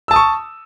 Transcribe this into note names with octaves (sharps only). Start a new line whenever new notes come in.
A5 C#6 D#6 E6